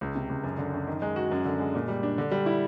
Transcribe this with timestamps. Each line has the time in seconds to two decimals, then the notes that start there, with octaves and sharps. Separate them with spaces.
0.01 C#2
0.15 C3
0.30 C#2
0.44 F#2
0.58 D3
0.74 F#2
0.87 D#3
1.02 G#3
1.16 F#4
1.31 F#2
1.45 D3
1.60 G#3
1.75 A#2
1.88 G3
2.03 D4
2.18 D3
2.31 G3
2.46 E4